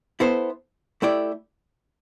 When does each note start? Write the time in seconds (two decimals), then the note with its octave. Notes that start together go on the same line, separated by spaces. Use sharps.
0.20 B3 E4 A4 C5
1.02 A3 E4 G4 D5